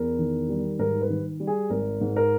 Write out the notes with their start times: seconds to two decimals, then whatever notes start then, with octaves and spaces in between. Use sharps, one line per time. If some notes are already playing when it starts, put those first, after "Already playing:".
Already playing: E2 A#4
0.19 D#3
0.49 G3
0.79 G#2 A#4
1.01 B4
1.10 D#3
1.40 G3
1.47 G#4
1.70 G#1 A#4
2.01 G#2
2.16 A#4